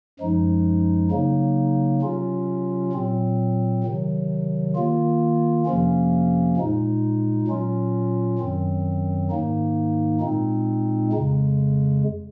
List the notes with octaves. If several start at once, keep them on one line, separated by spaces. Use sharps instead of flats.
F#2 F3 G#3 D#4
C#3 F#3 A#3 D#4
C3 F#3 C#4 F4
A#2 F#3 C4
C3 D#3 F#3
D#3 A#3 F4
F2 C3 F3 A#3 C#4
A#2 G#3 D#4
A#2 F#3 C#4 F4
F#2 D#3 F#3 C4
G#2 D#3 A#3 D#4
A#2 G#3 C4 D#4
F2 C#3 G#3